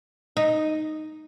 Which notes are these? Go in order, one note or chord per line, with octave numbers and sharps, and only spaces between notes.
D#4